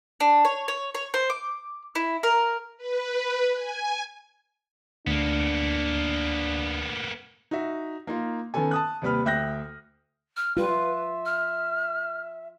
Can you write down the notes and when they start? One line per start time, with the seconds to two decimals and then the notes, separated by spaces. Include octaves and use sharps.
0.20 D4
0.45 C#5
0.68 C#5
0.95 C#5
1.14 C5
1.30 D6
1.95 E4
2.23 A#4
2.77 B4
3.53 G#5
5.07 D2 A#3 B3 D4
7.51 D#4 F#4 E5
8.07 A#3 D#4 F4
8.54 D#3 B3 C#4 A4 G#5
8.71 A5 D#6 F#6
9.02 D#2 C3 G3 B4 B5 F6
9.26 D2 E5 G5 F#6 G6 A#6
10.37 F6
10.57 G3 F4 B4
10.69 E5
11.26 F6